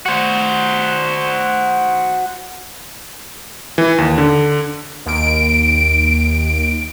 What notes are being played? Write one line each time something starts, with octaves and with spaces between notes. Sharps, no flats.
F#4 C5
E3
D#2
D3
D#2 D7